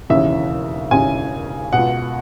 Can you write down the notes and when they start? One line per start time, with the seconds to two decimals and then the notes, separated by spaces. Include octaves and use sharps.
0.10 E1 D#2 C#3 E3 E5
0.91 E1 D#2 C#3 E3 G#5
1.73 C#2 B2 F#5